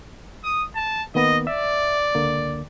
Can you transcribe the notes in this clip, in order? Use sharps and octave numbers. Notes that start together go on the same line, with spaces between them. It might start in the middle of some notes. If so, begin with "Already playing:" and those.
D#6
A5
D#3 A#3 B3 D#5
D5 E5
C#2 D3 A#3